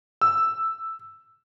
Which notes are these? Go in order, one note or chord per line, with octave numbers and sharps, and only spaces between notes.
E6